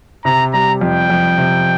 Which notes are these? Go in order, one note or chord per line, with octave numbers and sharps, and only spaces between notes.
C3 A#5
G3 A#5
F2 G5
F2
C3